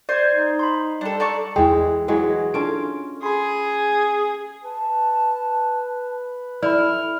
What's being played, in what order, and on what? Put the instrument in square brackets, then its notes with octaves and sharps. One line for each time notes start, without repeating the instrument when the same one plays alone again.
[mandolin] C5 [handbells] D5 G#6
[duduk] D#4
[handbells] B5 C6
[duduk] G3 [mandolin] D4 A4
[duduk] A4 [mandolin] D5 A5 C#6 [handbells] A#5
[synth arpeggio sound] E2 G5 [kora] E3 G#3
[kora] E3 F#3 G#3
[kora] C#4 F4 [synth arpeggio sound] D4 A4 D7
[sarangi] G#4 [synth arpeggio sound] B5 C6
[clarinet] B4 [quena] A5
[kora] E4 [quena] A4 [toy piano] D5 B5 [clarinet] F6